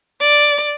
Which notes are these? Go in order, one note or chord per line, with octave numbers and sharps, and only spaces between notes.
D5